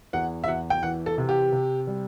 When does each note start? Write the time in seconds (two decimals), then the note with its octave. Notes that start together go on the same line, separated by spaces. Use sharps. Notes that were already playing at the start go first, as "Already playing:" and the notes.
0.13 E2 F#5
0.44 E5
0.47 E2 F#5
0.70 G5
0.82 E3 F#5
1.06 A4
1.18 C3
1.29 G4
1.52 C3
1.87 G3